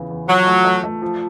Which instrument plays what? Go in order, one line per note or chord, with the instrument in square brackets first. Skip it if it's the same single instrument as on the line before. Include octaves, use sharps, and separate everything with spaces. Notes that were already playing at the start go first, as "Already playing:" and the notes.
Already playing: [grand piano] E2 C#3 E3
E2
[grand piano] F3 [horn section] F#3
[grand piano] A3
A3
A3
F3